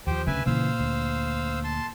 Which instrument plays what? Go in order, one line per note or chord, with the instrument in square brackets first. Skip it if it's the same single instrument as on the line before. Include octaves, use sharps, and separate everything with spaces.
[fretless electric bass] D#2 F3 [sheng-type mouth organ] G4 C5 G5
[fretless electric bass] D2 [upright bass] C#3 [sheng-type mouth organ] B4 E5 G#5
[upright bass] A#2 [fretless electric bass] C#3 E3 [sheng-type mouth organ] C5 F5 E6
[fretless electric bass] D2
[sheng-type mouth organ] A5 C6